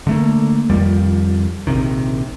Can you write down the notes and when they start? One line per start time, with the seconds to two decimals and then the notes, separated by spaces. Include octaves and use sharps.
0.07 D3 A3 A#3
0.70 F2 D#3 F3 G3
1.67 A#1 C3 D#3